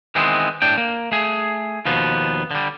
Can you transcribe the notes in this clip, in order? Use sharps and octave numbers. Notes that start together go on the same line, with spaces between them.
D#3 E3 G#3 B3 C4
A2 D4 G5
A#3
A3 G#4
D#2 B2 F3 B3
D3 G3